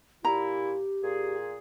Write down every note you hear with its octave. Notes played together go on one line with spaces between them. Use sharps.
A#2 E4 G4 A#5
A#2 G#4